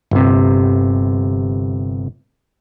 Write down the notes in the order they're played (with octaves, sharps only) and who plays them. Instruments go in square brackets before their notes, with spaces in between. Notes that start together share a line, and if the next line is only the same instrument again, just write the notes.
[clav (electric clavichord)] G1 C3